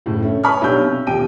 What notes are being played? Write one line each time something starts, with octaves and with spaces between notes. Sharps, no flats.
F#1 A2
A3 C#4
B4 C#5 G#5 B5 C#6 F6
B1 D4 G4 C#5 E6 G6
C3
D#1 B2 G4 G5 D7 D#7